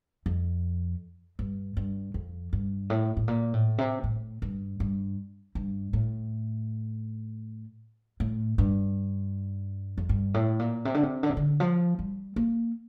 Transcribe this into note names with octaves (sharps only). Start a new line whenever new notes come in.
F2
G2
G2
F2
G2
A2
A2
A#2
A2
C3
A2
G2
G2
G2
A2
A2
G2
F2
G2
A2
A#2
C3
D3
C3
D3
C3
D3
F3
G3
A#3